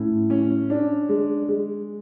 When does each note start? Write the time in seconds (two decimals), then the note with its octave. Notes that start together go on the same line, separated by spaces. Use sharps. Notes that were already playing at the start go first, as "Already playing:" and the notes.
Already playing: A2 C#4
0.30 C#4
0.70 D4
1.09 G#3
1.49 G#3